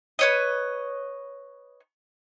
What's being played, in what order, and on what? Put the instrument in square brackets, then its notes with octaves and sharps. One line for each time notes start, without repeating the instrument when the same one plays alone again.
[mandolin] B4 C#5 D#5